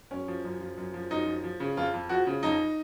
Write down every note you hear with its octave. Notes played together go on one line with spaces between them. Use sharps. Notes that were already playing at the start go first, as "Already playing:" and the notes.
F#2 C#4
F3
F#2
F3
F#2
F3
F#2 D#4
F3
F3
C#3
F2 F4
F2
F3 F#4
C#3
F2 D#4